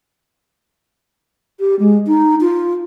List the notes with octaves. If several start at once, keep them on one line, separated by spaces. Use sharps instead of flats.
G4
G#3
D#4
F4